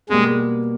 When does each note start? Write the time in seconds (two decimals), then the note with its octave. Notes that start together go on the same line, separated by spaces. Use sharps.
0.09 B2 G3 G#3 A#3